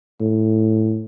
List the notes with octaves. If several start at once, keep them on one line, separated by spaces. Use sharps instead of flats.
A2